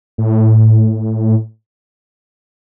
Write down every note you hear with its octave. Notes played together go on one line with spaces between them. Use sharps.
A2